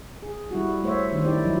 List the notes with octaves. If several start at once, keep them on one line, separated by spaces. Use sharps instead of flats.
G#4
G3 E4 F#4
A3 C5 C#5 E5
D#3 D4 C5
D#4 E4 G4 D5
F3 F#3 D#4 E4